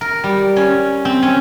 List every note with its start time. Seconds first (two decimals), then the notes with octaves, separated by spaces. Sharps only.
0.01 A#4
0.24 G3
0.56 C#4
1.05 C4
1.23 C#4